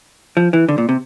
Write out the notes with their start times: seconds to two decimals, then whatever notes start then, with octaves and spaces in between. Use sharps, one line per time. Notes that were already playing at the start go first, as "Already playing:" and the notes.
0.37 F3
0.53 E3
0.69 D3
0.78 A#2
0.89 C3